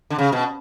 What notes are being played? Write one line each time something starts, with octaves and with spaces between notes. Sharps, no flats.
D3
C#3
B2